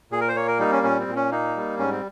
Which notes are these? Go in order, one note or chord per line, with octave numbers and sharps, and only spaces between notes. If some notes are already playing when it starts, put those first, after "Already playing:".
A#2 G#4
A#4
C5
A#3 C#5
A#4
G3 D#4
C#4
A#2 C#4
C4
A#2
C#4
A#3 D#4
G3
G#2 C#4
C4